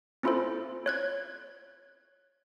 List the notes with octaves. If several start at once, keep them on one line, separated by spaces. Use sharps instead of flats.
C4 C#4 E4 F4 A4 C5
C#5 F#6 G#6